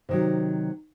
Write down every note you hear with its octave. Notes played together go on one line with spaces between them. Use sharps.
C3 D#3 F#3